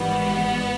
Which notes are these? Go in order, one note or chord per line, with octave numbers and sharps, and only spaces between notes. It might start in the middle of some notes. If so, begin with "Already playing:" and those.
Already playing: G#1 G#2 E3 G3 B3